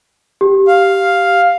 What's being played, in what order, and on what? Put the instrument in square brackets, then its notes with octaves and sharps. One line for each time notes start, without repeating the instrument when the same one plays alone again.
[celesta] G4
[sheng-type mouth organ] F5